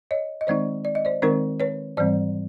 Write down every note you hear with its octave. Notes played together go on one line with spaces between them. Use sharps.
C#5 D#5
D#5
D#3 G#3 C4 D#4 C5 D5
D5
D#5
C5 D5
D#3 G#3 C4 D#4 A#4 C5
B4 C#5
G#2 E3 G3 C4 C5 D5